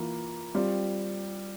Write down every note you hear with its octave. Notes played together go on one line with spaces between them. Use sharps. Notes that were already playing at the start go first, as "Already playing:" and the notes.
Already playing: E3 A#3 F4
G3 C4 F4